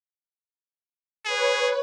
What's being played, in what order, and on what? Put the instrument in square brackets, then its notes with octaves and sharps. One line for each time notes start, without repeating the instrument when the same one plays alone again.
[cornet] G#4 [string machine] B4 C#5